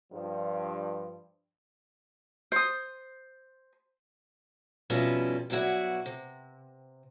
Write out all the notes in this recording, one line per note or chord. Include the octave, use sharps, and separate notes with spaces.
G2 F3
C5 D#6
F2 B2 G3 C#4 D#4 E4
G2 B2 F#3 E4 F#4 D5
C3